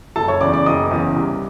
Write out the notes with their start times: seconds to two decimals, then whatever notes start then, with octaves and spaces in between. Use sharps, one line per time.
0.16 F#1 A4 A5
0.28 C#5 C#6
0.41 E2 C#3 D5 D6
0.53 D5 D6
0.66 F#1 D#5 D#6
0.91 E2 C#3
1.16 C2